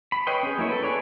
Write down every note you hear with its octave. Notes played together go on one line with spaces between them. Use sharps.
B5
B4 C#5 D#5 G5 C6
C#4 G#4
F#3 A#3 E4 C#5
A4 B4
G#4 B4 C#5 D5